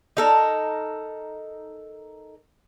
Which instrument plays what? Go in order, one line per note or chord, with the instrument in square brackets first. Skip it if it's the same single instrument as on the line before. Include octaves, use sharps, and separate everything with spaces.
[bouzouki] D#4 A4 A#4